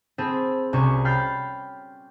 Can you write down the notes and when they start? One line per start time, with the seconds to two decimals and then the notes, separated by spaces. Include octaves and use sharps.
0.18 C4 G#4 A4 B5
0.73 C2 C3 C#4 F#4 C#6
1.05 G5 B5 F6 G6 A6 C7